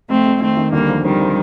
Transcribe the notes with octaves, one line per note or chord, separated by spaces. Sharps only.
F2 A3 C4
F2
D#3 A3 C4
D#3
D2 G3 A#3
F3
D#3 G3 C4
F3